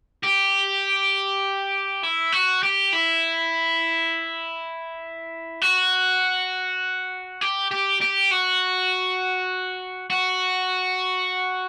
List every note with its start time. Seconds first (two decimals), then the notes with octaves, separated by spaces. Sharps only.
0.24 G4
2.03 E4
2.32 F#4
2.63 G4
2.93 E4
5.62 F#4
7.41 G4
7.71 G4
8.01 G4
8.31 F#4
10.10 F#4